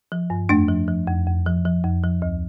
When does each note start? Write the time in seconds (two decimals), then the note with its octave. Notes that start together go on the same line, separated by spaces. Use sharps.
0.12 F3
0.30 G2
0.49 F2 A3 D4
0.68 F3
0.88 F3
1.07 F2
1.27 F2
1.46 F3
1.65 F3
1.84 F2
2.04 F3
2.22 D2